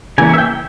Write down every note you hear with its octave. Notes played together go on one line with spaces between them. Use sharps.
C#3 E3 A#3 C#4 G#5
E5
G5